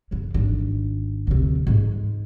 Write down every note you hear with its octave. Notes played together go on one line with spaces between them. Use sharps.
F#2 C#3
G#1 D4
D2 C3
G#2 G#3